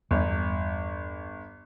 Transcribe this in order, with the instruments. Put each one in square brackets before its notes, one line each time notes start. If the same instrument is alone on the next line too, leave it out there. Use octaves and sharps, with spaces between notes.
[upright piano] G1 [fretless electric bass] E2 G3